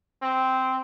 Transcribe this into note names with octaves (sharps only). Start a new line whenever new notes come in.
C4